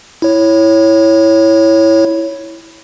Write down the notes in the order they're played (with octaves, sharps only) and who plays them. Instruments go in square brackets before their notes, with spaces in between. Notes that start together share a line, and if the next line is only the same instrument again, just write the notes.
[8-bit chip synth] E4 C#5